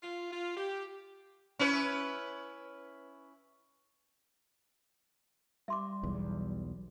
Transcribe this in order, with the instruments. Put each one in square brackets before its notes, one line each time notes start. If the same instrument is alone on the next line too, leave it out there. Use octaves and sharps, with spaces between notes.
[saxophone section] F4
F4
G4
[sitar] C#4 E4 B4
[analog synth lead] G3 [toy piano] E5 C6 D6
[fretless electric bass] B1 E2